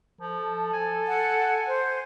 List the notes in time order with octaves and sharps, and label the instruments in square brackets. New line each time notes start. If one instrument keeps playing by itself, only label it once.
[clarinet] F3 [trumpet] A4
[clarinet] G#5
[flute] F#5
C5